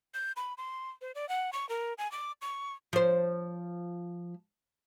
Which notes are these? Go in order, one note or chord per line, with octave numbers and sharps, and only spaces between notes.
G6
B5
C6
C5
D5
F#5
C#6
A#4
G#5
D6
C#6
F3 C5